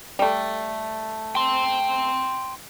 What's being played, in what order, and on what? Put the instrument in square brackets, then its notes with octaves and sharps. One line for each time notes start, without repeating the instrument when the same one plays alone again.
[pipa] G3 A3
[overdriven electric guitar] G5 C6